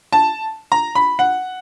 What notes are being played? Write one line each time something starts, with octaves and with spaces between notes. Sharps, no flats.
A5
A#5
B5
F#5